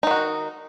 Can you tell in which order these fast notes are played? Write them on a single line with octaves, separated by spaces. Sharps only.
D#4 D#3 F#4